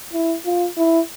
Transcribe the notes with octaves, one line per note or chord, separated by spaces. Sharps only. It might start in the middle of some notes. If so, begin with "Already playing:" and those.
E4
F4
E4